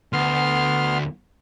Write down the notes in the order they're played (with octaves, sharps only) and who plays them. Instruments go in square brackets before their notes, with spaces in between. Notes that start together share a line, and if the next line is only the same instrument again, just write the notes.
[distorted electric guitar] D2 [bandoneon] B3 C6 F6